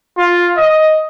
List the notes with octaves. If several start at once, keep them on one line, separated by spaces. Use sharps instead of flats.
F4
D#5